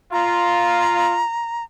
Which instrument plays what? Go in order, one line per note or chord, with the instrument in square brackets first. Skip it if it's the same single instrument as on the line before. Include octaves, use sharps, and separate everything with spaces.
[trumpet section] F4 [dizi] A#5